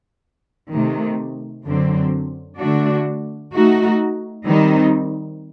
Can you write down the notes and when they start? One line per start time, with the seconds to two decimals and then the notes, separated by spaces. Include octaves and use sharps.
0.71 C3 D#3 A3
1.65 F#2 D3 F#3 C4
2.59 D3 A3 D4 F#4
3.53 A3 D#4 F#4
4.46 D#3 G3 C4 D#4